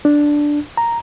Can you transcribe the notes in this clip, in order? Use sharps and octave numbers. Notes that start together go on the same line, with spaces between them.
D4
A#5